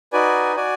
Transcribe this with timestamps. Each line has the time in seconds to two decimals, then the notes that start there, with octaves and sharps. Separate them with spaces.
0.13 D#4 F#4 B4 D5 G#5
0.56 F#4 D5 G#5